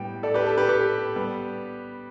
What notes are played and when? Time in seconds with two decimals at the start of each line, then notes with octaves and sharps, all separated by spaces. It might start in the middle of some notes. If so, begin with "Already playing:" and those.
Already playing: A2 G3 B3 G5
0.23 A4 D5
0.34 G4 B4
0.46 A4
0.58 G4 B4
0.69 G4 B4
1.16 G3 B3